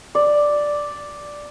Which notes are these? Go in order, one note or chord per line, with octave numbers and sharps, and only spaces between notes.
D5